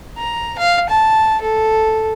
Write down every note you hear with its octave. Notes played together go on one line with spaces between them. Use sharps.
A#5
F5
A5
A4